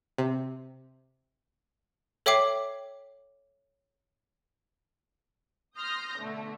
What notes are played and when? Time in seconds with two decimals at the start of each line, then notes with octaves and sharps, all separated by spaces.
0.18 C3
2.26 A4 C#5 E5 G5 D6 C7
5.77 C6 D#6 F6 G6 A#6
6.19 B2 D3 A3